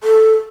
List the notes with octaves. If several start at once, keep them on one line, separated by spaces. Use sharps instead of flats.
A4